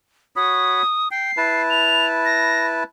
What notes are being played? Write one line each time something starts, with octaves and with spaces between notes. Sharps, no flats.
F#4 C#5 B5 D#6
G5 C7
E4 B4 A5
F7
A#6